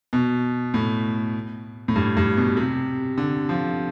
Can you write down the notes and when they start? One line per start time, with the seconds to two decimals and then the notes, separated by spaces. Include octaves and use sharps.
0.13 B2
0.74 A2
1.88 A2
1.96 G2
2.17 G2
2.37 B2
2.57 C3
3.18 D3
3.49 F3